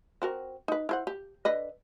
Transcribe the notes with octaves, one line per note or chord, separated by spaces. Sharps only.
C4 F#4 A#4
D#4 B4
E4 C5 F#5
G4
D3 B4 D#5